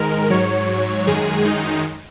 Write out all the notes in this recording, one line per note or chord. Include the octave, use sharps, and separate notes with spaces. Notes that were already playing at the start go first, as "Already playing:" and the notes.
Already playing: G#2 D#3 G#3 A#4
G#2 F#3 C#5
F#2 D#3 G#3 G#4
D#4